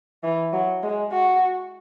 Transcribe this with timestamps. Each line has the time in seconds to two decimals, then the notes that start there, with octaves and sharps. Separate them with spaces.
0.23 E3
0.53 F#3
0.83 G#3
1.12 F#4